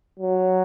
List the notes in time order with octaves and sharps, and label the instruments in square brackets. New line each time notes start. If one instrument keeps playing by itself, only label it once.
[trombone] F#3